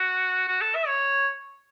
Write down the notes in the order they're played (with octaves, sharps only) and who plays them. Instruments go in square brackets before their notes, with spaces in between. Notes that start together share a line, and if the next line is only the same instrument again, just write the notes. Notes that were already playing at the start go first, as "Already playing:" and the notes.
Already playing: [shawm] F#4
F#4
A4
E5
C#5